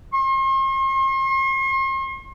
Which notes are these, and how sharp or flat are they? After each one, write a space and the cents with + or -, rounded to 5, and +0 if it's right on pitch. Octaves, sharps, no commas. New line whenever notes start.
C6 +45